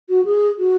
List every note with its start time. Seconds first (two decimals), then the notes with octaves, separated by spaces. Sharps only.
0.09 F#4
0.25 G#4
0.58 F#4